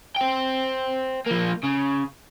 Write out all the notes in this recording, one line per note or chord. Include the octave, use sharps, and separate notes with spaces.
C5 G5
F3 A#3
C#3